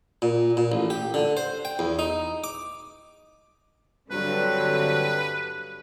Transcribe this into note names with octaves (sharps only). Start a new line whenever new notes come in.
A#2
A#2
A1
G4
D3
C5
G5
E2
D#4
D6
G2 D3 F#3 C4 B4